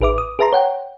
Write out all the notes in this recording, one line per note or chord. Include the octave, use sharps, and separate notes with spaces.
A1 G#4 B4 E5 D6
D#6
G#4 B4 E5 A5 A#5 C6
C#5 F#5 G5